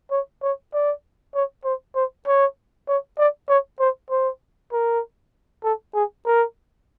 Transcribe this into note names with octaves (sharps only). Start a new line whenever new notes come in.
C#5
C#5
D5
C#5
C5
C5
C#5
C#5
D5
C#5
C5
C5
A#4
A4
G#4
A#4